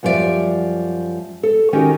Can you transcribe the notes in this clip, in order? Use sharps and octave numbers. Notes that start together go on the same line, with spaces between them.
F#2 F3 G3 B3 D5 E5
A4
D#3 C#4 D#4 F#4 G4 A#4